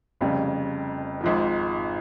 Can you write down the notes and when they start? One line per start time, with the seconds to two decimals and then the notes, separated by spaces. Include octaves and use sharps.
0.21 F1 F2 C#3 G3
1.21 G#1 G#2 F3